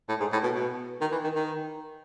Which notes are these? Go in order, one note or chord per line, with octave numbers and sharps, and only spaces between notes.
A2
G#2
A2
B2
B2
D#3
E3
D#3
D#3